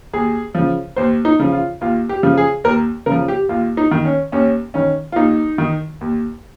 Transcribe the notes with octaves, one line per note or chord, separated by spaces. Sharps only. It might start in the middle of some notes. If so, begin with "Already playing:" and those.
D#2 G#4
C#3 F3
D#2 C5
D#4
C#3 F3
F4
D#2 F4
G4
C#3 F3
G#4
D#2 A#4
C#3 A#4
F3
G4
D#2 F4
D#4
D#3
C#4
D#2 C#4
D#3 C#4
F4
D#2 D#4
D#3
D#2